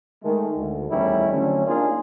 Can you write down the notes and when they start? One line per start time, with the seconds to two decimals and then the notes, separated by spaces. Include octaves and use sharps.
0.23 D#3 G#3 A3
0.57 D2
0.89 E2 A2 D#3 G3 C#4 E4
1.31 D3 F#3 A3 C4 C#4
1.66 A#3 D4 D#4 F4 G#4